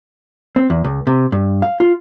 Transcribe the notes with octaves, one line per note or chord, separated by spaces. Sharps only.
C4
E2
C#2
C3
G2
F5
F4